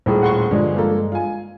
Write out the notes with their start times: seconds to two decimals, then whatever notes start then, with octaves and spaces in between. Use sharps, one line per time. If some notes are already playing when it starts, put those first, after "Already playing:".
0.06 D#1 A2 G#3
0.22 F#5 C6 C#6
0.51 G2 D3 F3 G#3
0.75 F3 A#3 A4
1.12 F4 G#5